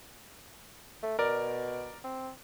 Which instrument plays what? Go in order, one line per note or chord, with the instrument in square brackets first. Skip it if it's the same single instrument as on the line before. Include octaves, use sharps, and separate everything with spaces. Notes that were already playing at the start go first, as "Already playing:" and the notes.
[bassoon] A3
[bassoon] B2 [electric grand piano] A#4 D5
[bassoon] C4